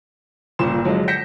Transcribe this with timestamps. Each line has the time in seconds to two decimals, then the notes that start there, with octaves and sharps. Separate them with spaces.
0.59 G1 A#2 C#3 C6 E7
0.85 D3 F3 F#3 G#3
1.08 G6 A#6 B6 C#7 E7